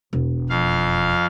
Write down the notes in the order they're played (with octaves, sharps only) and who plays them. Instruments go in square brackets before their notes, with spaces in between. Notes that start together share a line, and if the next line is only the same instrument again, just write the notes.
[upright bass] E1
[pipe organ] F2 F5